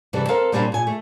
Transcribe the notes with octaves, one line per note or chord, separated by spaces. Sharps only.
G2 C3 E3 G3 A4
C4 A4 A#4 C5 F5
A#2 G3 A#3 C4 D4 F4
A#2 G#5
A3